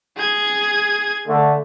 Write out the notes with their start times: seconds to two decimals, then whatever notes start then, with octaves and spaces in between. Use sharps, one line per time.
0.17 G#4 G#6
1.27 D3 A3